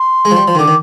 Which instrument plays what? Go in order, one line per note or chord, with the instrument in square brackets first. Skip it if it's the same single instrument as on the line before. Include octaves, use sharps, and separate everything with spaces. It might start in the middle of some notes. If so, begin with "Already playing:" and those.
Already playing: [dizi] C6
[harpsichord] G#3
F3
G3
F3
D#3
[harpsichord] D3 [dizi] D6
[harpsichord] D#3